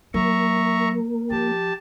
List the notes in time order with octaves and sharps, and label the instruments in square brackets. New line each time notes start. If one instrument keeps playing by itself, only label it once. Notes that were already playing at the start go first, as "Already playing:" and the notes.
[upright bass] F#3 [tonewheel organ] A#3 [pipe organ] E5 A#5 C#6
[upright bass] F3 [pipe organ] G4 A5